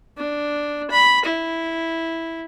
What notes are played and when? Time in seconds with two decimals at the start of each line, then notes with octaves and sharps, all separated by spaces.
0.18 D4
0.91 B5
1.25 E4